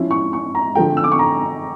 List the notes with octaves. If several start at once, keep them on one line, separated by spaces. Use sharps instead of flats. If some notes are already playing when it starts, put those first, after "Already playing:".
Already playing: F3 C#4 E4
C#6
C#6
A#5
D3 F3 A3 G5
E6
D6
C#6
A#5